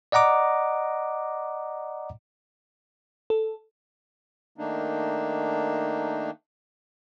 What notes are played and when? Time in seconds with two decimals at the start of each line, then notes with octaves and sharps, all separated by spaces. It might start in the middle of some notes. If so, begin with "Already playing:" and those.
0.12 D5 D#5 F#5 A#5 D6
3.30 A4
4.58 D#3 A3 A#3 D4 D#4